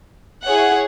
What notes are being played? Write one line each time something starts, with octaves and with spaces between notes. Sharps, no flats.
E4 G#4 C#5 F#5